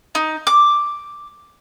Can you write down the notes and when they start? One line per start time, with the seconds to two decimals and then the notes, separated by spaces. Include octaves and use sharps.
0.15 D#4
0.47 D6